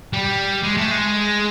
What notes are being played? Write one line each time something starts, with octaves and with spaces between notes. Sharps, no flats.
G3
G#3
A3
G#3